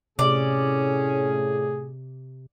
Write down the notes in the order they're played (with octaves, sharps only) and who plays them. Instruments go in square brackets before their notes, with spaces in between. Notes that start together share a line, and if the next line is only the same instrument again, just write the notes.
[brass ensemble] A2 G#4 [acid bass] C3 [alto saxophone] C#4 [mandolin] D5